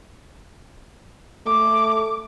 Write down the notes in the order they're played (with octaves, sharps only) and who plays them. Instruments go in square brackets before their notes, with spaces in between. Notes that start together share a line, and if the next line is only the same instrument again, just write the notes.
[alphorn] A3 [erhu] D6